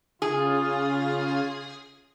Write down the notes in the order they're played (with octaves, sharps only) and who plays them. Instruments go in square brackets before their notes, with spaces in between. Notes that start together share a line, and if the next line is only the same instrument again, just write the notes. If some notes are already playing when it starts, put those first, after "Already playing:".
[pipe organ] C#3 F4 [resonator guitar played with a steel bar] G#4